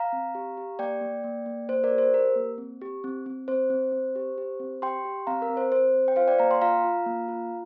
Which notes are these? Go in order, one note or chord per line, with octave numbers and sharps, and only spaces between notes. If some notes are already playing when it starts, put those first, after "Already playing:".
Already playing: F5 A#5
C4
G4
G4
A#3 D5 G5
A#3
A#3
A#3
A#3 C5
A#4 D5
G4
C5
G4 A#4
A#3
C4
G4
C4
C4
C4 C5
C4
C4
G4
G4
C4
G4 G5 C6
G4
C4 F5 A#5
A#4
C4
C5
C4 C5
C4
G5
F4 C5 F5
D5 G5
A#3 F5 A#5
G5 C6
F4 F5 A#5
F4
A#3
F4